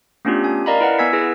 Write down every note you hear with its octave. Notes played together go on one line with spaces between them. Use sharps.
A3 B3 C#4 D4 F4 G4
G#5
A#4 D5 D#5 F5 A#5 B5
E4 B4 F#5
B3 G#5 E6 G#6 B6
E4 G#4 B4